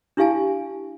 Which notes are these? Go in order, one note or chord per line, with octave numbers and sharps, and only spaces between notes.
D4 E4 G4 F5 G#5 A5